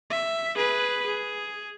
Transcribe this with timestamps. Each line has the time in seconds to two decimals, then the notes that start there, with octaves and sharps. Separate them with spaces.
0.10 E5
0.55 G#4 B4
1.06 G#4